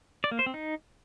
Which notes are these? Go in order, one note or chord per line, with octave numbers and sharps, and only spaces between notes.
D5
A#3
C5
C4
D#4